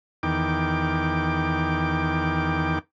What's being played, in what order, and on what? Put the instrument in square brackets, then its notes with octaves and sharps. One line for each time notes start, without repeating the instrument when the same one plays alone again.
[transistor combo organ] E2 D#3 G5 D6